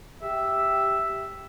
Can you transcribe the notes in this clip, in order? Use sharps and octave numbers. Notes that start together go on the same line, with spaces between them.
G4 E5